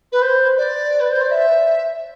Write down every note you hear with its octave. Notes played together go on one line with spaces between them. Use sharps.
B4
C5
D5
B4
C5
D5
E5